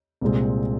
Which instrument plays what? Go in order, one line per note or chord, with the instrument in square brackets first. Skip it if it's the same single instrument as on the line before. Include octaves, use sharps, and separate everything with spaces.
[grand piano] C2 A#2 G#3 C4